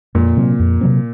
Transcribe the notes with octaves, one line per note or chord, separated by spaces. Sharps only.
F2 A#2
C3 F#3 C4
F2
C3 F#3 C4